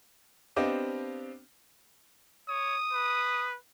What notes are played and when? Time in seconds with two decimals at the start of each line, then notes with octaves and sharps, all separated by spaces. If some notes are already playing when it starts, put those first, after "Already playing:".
0.56 B3 C4 D4 G4 D#5 F5
2.49 C#5 D#6
2.93 B4